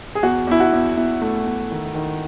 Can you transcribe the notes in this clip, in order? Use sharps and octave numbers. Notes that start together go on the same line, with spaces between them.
G#4
E2 F#4
E2 E4
F#4
E2
E2 E4
A3
E2
D#3
D#3